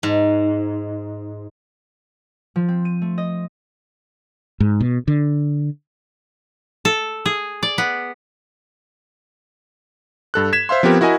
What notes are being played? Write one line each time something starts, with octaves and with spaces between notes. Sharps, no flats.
G#2
F3
C4
D#7
A3
D#5
G#2
B2
D3
A4
G#4
D5
B3
G2 A4 F#6
G#6 B6 E7
C5 E5 F5 C6
F3 B3 C4 G4 A#4
E4 F#4 A#4 D#5 G#5